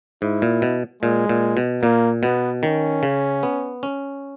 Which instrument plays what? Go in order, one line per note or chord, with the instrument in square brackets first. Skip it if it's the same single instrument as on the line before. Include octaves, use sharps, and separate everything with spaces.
[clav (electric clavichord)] G#2 [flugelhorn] E4
[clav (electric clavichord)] A#2
B2
[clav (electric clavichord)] A#2 [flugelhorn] G#3
[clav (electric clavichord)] A#2
B2
[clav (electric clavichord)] A#2 [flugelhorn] A#3
[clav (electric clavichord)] B2 [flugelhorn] B3
[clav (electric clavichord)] D#3 [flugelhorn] C#4
[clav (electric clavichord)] C#3
B3
C#4